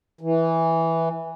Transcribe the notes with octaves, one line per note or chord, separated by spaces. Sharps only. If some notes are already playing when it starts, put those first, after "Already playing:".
E3